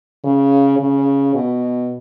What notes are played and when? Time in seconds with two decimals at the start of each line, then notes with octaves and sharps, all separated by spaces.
0.24 C#3
0.79 C#3
1.35 B2